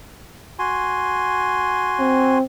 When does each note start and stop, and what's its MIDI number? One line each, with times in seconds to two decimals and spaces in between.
0.59 2.38 66
0.59 2.38 80
0.59 2.38 84
2.00 2.42 60